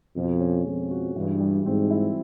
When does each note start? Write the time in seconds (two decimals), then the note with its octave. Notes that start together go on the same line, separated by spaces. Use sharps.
0.16 F2 B2
0.40 C#4
0.66 F2 G#3
0.91 F#4
1.15 G2 E3
1.40 G3
1.65 G#2 C4
1.90 E4